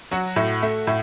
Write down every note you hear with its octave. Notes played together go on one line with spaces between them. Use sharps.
F#3 F#4
A2
A3
A2